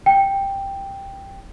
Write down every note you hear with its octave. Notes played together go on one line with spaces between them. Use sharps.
G5